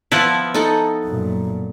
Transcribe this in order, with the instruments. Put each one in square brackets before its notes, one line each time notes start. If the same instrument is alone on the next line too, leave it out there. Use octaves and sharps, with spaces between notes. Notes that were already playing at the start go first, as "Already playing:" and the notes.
[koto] F3 B3 E4 [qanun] E5 F5 A5
[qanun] D#4 A4 F#5
[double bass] F#2 A#2